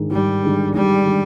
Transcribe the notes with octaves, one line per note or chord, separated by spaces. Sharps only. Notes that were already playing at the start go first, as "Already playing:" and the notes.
Already playing: G#2 D#3 G#3 D4
G#2 G3
D#3 G#3 D4
G#2 G3
D#3 G#3 D4